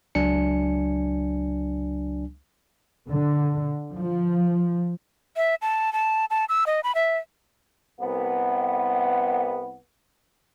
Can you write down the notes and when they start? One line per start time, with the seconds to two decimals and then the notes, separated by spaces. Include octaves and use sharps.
0.15 C#2 F#3 D4 G#5 C#7
3.10 D3
3.95 F3
5.37 E5
5.62 A5
5.93 A5
6.30 A5
6.49 E6
6.67 D#5
6.84 B5
6.95 E5
8.01 C2 B3